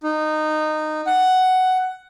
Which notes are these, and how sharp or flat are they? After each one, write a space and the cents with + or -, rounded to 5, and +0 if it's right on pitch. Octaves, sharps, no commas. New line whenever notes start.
D#4 -15
F#5 +5